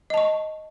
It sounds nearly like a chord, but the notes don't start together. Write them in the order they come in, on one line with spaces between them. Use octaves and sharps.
D#5 A5 C#6